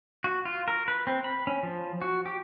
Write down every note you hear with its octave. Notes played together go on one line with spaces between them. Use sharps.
F#4
F4
A#4
B4
C4
B5
C#4
F3
F#4
G4